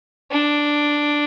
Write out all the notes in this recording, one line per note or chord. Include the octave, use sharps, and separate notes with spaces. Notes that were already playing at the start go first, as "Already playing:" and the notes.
D4